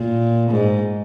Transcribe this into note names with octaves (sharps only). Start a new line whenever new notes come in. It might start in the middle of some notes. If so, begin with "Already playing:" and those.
Already playing: A#2
G#2